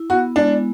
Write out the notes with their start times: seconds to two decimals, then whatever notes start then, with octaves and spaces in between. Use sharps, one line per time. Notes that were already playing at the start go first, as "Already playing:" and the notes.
Already playing: E4
0.10 B3 F#4
0.36 G#3 D4